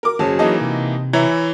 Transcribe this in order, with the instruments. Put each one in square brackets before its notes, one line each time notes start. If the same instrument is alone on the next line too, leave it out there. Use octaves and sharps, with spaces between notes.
[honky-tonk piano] A#4 D6
[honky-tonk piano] F#1 A5 [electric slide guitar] F#3 G#4 C#5
[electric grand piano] E3 A#3 D#4 [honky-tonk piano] D#5 A5
[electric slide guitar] C3
[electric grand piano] E3 E4 C#5 [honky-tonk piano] E5 A#5